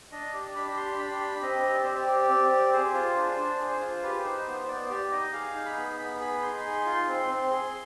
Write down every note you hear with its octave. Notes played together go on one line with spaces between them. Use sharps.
D4 D#5
G4 D5
D4 B5
G4 C6
D4 B5
G4 B5
C4 D#5
G4
D5
C4 C5
D5
G4
C4
G4
G#4 C5
F4
D4
D4 C5
G#4
C5
F4
G4 B4
D#4 C5
B3 C5
B3 D5
G4 D5
D#4 D#5
G#4 F5
D#4
B5
B3
B3 B5
G#4 B5
D#4 C6
G#4
F4
C4
C4
G#4